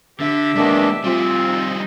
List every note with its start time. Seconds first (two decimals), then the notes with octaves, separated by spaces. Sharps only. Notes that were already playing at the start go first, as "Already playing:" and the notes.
0.20 D3 G4 E5
0.56 E2 D#3 G#3 A#3 D4
1.04 G3 C4 F4 G#4
1.49 D#4